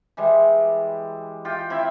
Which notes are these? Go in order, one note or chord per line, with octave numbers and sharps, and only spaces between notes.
E3 G3 G#3
F4 G4 G5
C4 E4 E5